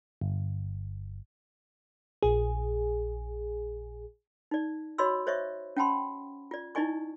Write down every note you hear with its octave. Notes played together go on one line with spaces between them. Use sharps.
G1
A#1 G#4
D#4 D5
F#4 C#5 D#5 B5 C6 E6
C5 C#5 D#5 E5 C#6
C#4 F#5 G5 A5 B5 C6
F4 D5
D#4 E4 D5 D#5 G#5 C#6